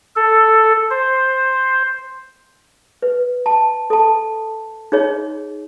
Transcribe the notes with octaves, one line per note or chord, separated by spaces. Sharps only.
A4
C5
B4
A5
A4 A5
D#4 G#4 C#5 D#5